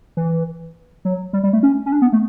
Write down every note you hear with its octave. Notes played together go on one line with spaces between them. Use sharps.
E3
F#3
G3
G3
A3
C#4
C#4
D4
B3
A3